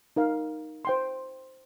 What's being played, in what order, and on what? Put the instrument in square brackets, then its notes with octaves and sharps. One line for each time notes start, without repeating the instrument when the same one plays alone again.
[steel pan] D#4 A#4 F5
C5 G5 C6